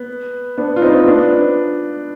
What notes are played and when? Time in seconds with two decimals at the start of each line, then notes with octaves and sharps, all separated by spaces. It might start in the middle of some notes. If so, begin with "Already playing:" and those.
Already playing: B3
0.57 B3 D4
0.76 F4
0.82 C4 D#4
1.07 B3 D4